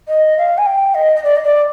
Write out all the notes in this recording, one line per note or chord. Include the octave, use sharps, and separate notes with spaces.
D#5
F5
G#5
G5
D#5
D#5
D5
D#5
D5